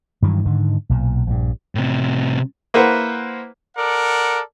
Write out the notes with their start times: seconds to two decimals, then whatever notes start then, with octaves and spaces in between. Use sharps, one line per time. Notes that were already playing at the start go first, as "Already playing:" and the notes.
0.22 G2 D#3 E3 F#3
0.45 G#2 D3 D#3
0.89 B1 A#2
1.27 A#1 G2
1.75 A2 C3
2.74 A#3 E4 B4 C5 E5 F#5
3.77 A4 A#4 D5 F#5